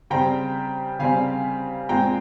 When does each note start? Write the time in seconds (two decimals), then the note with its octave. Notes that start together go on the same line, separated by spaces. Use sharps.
0.10 C#3 G3 C4 G5 A#5
0.99 C#3 G3 C4 F5 G#5
1.89 A#2 G#3 C4 G5 A#5